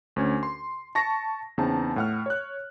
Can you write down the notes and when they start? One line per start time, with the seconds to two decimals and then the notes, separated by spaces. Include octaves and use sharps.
0.16 D2 C#4 G#5
0.43 C6
0.95 A5 C#6 A#6
1.58 E2 C#3 C4 D#4 A5 A#5
1.96 A2 F#5 F6
2.26 C#5 F#6